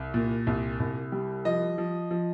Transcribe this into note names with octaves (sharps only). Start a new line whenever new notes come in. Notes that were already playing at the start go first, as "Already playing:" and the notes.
Already playing: C2
A#2
C2
C2
G3
F3 D#5
F3
F3